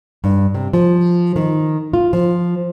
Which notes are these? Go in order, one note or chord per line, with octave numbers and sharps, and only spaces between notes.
G2
C3
F3
D#3
F4
F3